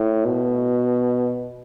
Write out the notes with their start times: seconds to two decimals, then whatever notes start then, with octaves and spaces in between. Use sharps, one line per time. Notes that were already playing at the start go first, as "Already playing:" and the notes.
Already playing: A2
0.25 B2